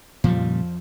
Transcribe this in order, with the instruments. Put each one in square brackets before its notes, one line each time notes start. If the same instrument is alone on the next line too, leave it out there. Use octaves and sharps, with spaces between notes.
[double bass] F2 [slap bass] A#2 C#3 G3 [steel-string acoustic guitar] F3